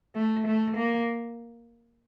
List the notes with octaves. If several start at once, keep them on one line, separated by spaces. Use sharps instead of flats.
A3
A3
A#3